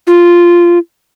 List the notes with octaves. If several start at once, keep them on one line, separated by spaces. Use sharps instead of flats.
F4